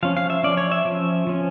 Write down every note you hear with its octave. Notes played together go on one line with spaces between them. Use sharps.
F3 C#4 F5
F5
E5
F3 C#4 D5
C#5
E5
F3 C#4
F3 C#4